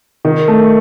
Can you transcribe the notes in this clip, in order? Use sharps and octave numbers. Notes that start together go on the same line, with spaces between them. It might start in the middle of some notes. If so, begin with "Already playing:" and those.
D#3
A3